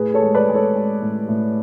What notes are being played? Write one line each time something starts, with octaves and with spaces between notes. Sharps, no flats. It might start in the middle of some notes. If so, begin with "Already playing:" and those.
Already playing: A2 G#4 B4
A4 C#5
G#3
B4 D5
G#3
A4 C#5
G#3
A2
A2